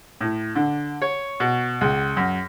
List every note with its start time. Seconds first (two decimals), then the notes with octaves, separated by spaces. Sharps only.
0.21 A2
0.55 D3
1.02 C#5
1.40 B2
1.81 C#2
2.17 F#2